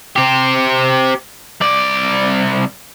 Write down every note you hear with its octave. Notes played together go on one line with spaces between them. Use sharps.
C4 G4
C2 D5